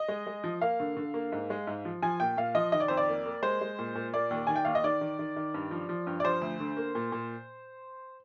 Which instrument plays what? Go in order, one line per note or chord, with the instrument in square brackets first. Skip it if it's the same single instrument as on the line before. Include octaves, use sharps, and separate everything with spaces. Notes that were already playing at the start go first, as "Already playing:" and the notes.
Already playing: [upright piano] D#5
G#3
G#3
F3
A#3 F5
D3
D3
A#3
G#2
G#3
G#2
F3
F3 G#5
A#2 G5
A#2 F5
F3 D#5
D#3 D#5
D5
F2 C5
D5
A#3
A#3
G#3 C5
G#3
A#2
A#2
A#3 D5
D#2
D#3 G#5
G5
D#2 F5
D#5
D#3 D5
D#3
D#3
D#3
G2
F3
F3
G2
D5
F3 C5
D2
D3
A#3
A#2
A#2